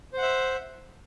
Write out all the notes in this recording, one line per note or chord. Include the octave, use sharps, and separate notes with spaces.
C5 E5 F#5